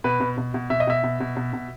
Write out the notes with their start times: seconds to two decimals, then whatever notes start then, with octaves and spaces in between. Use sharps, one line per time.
0.04 B2 B4
0.20 B2
0.38 B2
0.54 B2
0.70 B2 E5
0.80 D#5
0.87 B2 E5
1.04 B2
1.20 B2
1.37 B2
1.53 B2